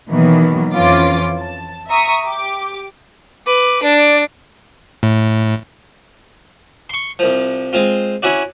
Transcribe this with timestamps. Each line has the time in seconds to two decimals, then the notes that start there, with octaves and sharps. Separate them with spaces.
0.11 B2 D#3 E3 F#3 A#3 B3
0.73 F2 E3 C#4 F4 D6
1.39 A5
1.89 E5 A#5 C#6 D#6
2.25 G4 D6
3.46 B4 D6
3.83 D4 D5
5.03 A2
6.90 C6 C#6
7.19 C2 F3
7.73 G#3 C4 F4
8.23 C#4 E4 F#4 D5